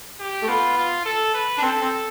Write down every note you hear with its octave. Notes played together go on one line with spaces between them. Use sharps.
G4
A3
B3 F4
F4
A4
B4
D4
C4 A4
C4